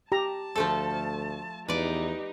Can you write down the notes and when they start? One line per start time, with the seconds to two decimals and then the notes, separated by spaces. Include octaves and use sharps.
0.12 G4 A5 A#5
0.56 D2 F3 A3 A4
1.68 E2 D#4 G4 B4 D5